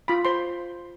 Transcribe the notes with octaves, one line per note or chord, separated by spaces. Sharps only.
F4 B5
C5 C6